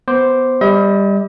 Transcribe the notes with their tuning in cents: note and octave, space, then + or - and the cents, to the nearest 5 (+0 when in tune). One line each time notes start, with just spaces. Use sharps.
B3 +5 C5 +0 D6 +0
G3 +15 D#5 +45